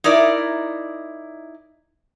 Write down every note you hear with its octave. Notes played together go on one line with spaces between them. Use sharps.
D#4 E4 A#4 D5